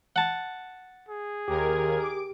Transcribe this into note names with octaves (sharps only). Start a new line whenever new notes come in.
F#5 A5
G#4
D#2 G4 A#4 G#6
D6 D7